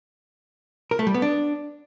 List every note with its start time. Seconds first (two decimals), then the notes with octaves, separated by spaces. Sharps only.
0.91 A#4
0.99 A3
1.07 G3
1.14 B3
1.22 D4